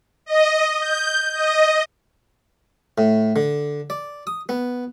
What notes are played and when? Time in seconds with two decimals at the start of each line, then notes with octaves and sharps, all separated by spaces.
0.25 D#5
0.79 G6
1.33 D#5
2.98 A2
3.36 D3
3.90 D5
4.27 D#6
4.49 B3